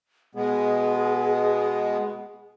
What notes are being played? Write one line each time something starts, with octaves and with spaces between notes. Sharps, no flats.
B2 G#3 B3 G#4